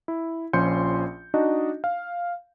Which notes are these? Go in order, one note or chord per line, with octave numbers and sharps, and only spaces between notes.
E4
A#1 F3 C#4 C6 G6 C#7
D4 D#4 F#4 D#5
F5